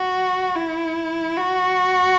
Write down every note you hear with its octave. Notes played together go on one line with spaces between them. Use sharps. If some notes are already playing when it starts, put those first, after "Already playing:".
Already playing: F#4
E4
F#4